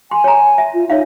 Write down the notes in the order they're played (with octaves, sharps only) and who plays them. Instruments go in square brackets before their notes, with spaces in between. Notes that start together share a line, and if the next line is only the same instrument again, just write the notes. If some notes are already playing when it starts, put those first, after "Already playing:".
[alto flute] G#5 [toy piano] C6
[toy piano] C#5 A#5
E5
[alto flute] F4
[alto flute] D#4 [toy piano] C#5 E5 F5